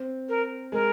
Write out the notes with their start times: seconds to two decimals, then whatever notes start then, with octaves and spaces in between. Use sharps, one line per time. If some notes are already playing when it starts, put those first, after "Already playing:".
Already playing: C4
0.29 A#4
0.72 G#3 A#4